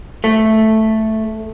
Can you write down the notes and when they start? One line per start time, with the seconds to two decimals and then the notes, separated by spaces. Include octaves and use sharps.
0.24 A3